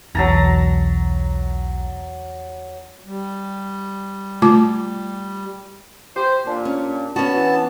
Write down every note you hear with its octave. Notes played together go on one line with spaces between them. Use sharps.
B1 E2 E3 F#3 A5 A#5
G3
A3 F4 D6
G4 C5
A#2 D4
C#4
B3 C#4 F#4 A5
E3